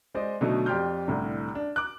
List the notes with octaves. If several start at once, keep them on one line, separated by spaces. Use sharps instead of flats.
G#3 C5 D5 D#5
B2 D3 F#3 A3 D#4
F2 G4 D5 C6 F6 G6
C2 A2 D3
D4
D6 F#6